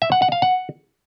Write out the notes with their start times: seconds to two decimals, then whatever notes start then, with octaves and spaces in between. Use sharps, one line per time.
0.02 E5
0.12 F#5
0.22 F#5
0.32 F5
0.42 F#5